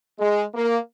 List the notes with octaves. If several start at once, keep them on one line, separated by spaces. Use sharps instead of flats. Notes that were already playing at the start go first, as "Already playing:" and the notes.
G#3
A#3